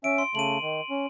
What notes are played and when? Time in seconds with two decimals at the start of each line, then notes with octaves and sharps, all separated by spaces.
0.04 C#4 E5 D7
0.18 C6
0.35 C#3 A3 D#7 F#7
0.62 D#3
0.90 C#4